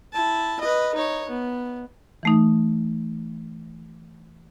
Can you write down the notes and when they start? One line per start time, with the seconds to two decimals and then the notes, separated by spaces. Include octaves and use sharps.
0.13 E4 A5
0.61 B4 D#5
0.94 D#4 C#5
1.29 B3
2.23 E3 A3 D#4